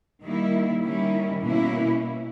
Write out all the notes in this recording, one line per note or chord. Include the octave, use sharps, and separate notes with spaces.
D#3 G3 A#3 E4
D#3 G3 C#4 E4
B2 A#3 C#4 E4